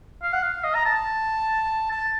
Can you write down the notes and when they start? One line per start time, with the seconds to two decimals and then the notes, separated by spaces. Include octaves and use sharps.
0.23 F5
0.33 F#5
0.43 F5
0.64 D#5
0.75 A#5
0.85 A5
1.91 A5